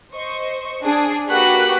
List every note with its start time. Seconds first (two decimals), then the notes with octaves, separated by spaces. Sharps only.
0.13 C5 D#5 C#6
0.83 D4 G#4
1.29 A#3 F#4 G4 B4 F#6 B6